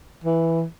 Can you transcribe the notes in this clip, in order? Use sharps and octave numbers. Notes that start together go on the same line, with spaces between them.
E3